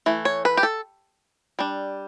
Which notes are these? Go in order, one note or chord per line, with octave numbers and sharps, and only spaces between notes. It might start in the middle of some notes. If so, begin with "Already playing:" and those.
E3 A3
C#5
B4
G4
A4
G3 D4